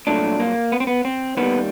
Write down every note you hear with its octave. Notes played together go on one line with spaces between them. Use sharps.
C2 A#2 F#3 A3 D4
A#3
B3
C4
B3
C4
D#2 D#3 G3 B3